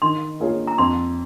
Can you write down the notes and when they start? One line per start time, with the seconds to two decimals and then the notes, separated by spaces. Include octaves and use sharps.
0.02 D#3 C6
0.40 A#3 F4 G#4 C#5
0.67 A#5
0.78 F2 C6